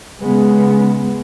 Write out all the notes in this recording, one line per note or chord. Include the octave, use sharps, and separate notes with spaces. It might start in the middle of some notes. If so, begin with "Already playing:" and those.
C#3 G#3 B3